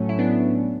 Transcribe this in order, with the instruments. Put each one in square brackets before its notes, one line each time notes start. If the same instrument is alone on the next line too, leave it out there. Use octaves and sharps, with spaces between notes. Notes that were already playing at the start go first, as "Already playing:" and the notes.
Already playing: [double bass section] A2 F#3 A3 C#4
[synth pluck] E4
B3 D4